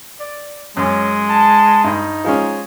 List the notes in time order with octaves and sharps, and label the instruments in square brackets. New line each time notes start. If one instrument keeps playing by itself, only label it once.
[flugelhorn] D5
[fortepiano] F#2 [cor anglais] G#3 [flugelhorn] C#4
[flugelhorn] A5
[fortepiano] G2 [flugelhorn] D#4
[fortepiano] F3 G#3 C#4